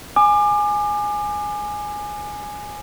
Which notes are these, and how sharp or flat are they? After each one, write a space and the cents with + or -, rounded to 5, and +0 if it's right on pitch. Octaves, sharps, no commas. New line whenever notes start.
G#5 +0 D6 +35